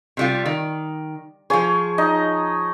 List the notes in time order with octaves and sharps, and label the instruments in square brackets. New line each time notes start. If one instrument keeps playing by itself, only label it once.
[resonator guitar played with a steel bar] C3 G3 F4
D#3
[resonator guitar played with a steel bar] F3 F4 G#4 [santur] C#5
[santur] D#4 D#5